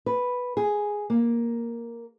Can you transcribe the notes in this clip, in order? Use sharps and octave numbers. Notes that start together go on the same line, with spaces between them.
B4
G#4
A#3